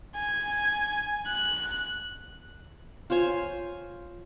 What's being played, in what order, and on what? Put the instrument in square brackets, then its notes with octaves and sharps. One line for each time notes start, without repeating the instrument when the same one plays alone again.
[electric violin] G#5
F#6
[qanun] F4 C5 C#5 G#5